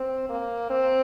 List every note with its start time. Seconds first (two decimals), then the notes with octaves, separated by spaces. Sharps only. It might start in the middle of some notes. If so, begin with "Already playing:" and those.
Already playing: C4
0.29 A#3
0.70 C4